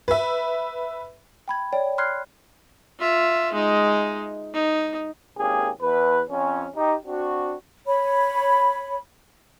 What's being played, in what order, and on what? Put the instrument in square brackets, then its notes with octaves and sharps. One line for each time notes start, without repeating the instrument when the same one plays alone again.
[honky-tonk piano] B4 E5
[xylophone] G5 B5 G#6
C#5 D5 G5
B5 C6 F6 F#6 G#6 C7
[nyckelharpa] F4 E5
G#3 D#4
D#4
[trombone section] G#1 A#3 C#4 G4 G#4
E2 B4
F2 C#4
D#4 G4
C4 D4 F#4
[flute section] C#5 B5